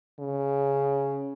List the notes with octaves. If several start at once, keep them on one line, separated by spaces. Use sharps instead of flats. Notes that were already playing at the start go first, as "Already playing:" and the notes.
C#3